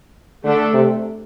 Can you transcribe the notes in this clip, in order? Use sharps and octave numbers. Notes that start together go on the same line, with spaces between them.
D3 A3 D4 A4
C3